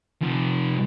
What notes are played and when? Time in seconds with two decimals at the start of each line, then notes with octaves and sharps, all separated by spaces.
0.22 C3 F3